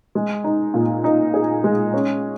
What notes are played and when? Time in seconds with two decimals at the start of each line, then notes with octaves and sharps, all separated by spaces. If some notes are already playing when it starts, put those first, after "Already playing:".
0.15 G#3
0.44 D#4
0.74 A#2
1.04 D#4
1.34 G#4
1.64 G#3
1.94 C#4